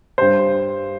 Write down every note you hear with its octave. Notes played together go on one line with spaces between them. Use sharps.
G2 G3 C5